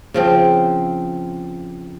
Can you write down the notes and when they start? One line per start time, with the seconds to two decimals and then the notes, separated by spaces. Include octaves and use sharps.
0.14 C#3 F3 C4